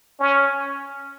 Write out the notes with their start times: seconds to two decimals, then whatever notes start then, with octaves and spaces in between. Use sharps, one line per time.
0.20 C#4